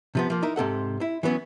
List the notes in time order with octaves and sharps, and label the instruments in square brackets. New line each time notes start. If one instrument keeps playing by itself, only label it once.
[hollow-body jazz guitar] C3 F3 B3
F3 A#3
D#4 E4 A#4
G#2 C3 A4 F#5
E4
E3 F#3 B3 C#4